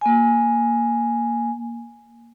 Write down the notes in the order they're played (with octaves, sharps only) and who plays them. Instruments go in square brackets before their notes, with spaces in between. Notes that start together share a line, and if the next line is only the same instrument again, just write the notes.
[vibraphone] A#3 G#5